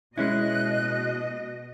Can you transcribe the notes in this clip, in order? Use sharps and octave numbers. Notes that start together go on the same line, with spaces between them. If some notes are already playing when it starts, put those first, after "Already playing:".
B2 G#3 C#4 E4 D#5 F#6